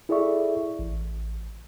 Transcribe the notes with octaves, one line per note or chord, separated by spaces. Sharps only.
E4 G#4 A4 D5 E5 C#6
A1